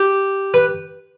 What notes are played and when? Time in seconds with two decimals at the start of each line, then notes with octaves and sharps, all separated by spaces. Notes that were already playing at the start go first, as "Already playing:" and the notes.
Already playing: G4
0.54 B4